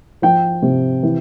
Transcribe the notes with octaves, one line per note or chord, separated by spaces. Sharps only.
F3 G5
C3
E3